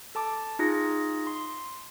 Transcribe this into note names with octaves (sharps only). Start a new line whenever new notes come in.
A4 A5 D6
D#4 F4 G#4 A#6
C6